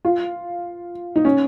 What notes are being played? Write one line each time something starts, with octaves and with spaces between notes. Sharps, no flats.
F4
D#4
C#4